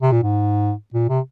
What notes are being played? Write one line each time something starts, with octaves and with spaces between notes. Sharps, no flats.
C3
A#2
G#2
A#2
C3